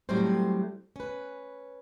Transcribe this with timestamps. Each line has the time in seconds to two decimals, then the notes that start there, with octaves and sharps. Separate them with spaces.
0.09 A2 F#3 G3 A3 C4 C5
0.96 C#4 B4